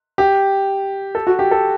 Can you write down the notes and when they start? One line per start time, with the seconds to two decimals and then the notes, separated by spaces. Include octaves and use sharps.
0.18 G4
1.15 A4
1.27 F#4
1.39 G4
1.51 A4